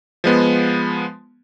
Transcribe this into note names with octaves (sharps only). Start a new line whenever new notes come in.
F3 G#3 B3